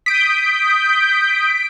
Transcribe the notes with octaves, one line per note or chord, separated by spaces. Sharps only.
D#6 G6 B6 D7